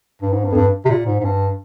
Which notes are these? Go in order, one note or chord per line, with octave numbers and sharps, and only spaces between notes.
G2
G#2
G2
F2
G2
C3
A#2
G#2
G#2
G2